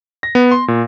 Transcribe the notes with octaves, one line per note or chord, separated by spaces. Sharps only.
A#6
B3
C6
A#2